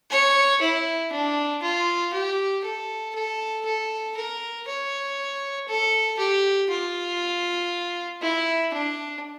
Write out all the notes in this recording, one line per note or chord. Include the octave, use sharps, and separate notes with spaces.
C#5
E4
D4
F4
G4
A4
A4
A4
A#4
C#5
A4
G4
F4
E4
D4